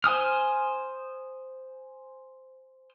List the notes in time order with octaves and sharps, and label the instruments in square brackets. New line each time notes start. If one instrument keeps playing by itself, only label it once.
[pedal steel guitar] C5 G#5 D#6 F6